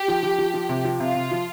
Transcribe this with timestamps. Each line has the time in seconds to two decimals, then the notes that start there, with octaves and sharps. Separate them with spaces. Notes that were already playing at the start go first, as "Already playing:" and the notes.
Already playing: G4
0.08 F3
0.23 F3
0.38 F3
0.54 F3
0.69 C3
0.85 F3
1.00 C3 F4
1.15 C3
1.31 F3